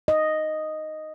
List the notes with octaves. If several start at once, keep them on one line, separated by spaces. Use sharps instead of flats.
D#5